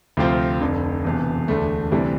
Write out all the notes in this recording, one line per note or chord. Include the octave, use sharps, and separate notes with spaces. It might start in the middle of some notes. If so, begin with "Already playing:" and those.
D2 C3 F3 C4 F4
F1 F2 D3
E1 E2 C3
E1 D2 D3 A3
D2 C3 E3 G3 D4